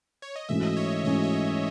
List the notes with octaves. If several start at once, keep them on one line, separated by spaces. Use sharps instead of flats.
C#5
D#5
G#2 E3 A3 C#4 F#4 E5
D#5
C#5
G#2 E3 A3 C#4 F#4 D#5
E5